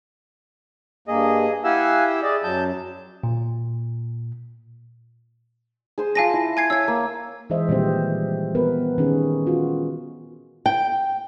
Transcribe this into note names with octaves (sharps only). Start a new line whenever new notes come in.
G2 A#3 G#4 D#5
E4 G4 F5 F#5 G#5 E6
G#4 D5 D#5
F#2 F#3 A5 G6
A#2
G#4 C5 C6
F4 F5 G#5 A5 A#6
E4
G#5 G#6 C7
C#5 E5 F5 E6 G#6
A#3
E3 G#3 G#4 C5 D#5 E5
A#2 D#3 G3 C4 G4 C5
B3 A#4 B4
D#3 C#4 G#4
F4 F#4
G5